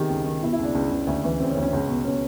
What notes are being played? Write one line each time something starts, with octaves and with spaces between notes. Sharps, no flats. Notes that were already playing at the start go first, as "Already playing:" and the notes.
Already playing: C3 D#3 G4 G#4
C#2
D#3
B2 E4
E4
C#2 D4
C#2
C#2
D2
E3
C#3 C4
C#4
D2
C#4
C#2
B2
B2 C#4